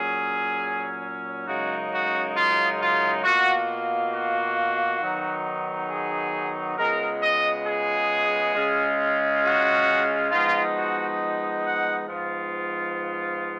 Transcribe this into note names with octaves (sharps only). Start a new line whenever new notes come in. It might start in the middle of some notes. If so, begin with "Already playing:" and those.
Already playing: A#2 F#3 C#4 G#4
F#2 C#3 G#3 D#4 F#4
F#4
F4
F4
B2 A#3 F4 F#4
F#4
D#3 F#3 B3 D#4
G#4
C#3 G#3 B3 F4 A#4
D#5
G#4
C#3 G#3 C#4 F4
F#4
F3 G#3 B3 D#4 F4
F#4
F#5
G#2 F3 B3 F4